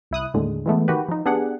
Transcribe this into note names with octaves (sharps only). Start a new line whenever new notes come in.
C2 E4 D#6 F#6
D#2 A2 D3 G#3
E3 G#3 A3 B3
D#3 F#4 G4 B4
F3 D#4
B3 D4 G4 G#4 F#5